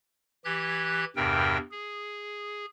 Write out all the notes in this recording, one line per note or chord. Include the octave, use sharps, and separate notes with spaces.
E3 G4 F#6 G#6
E2 G2 C3 A#4 G5
G#4